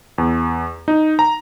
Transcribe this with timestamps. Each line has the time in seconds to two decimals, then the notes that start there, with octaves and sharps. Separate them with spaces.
0.18 E2
0.88 D#4
1.19 A#5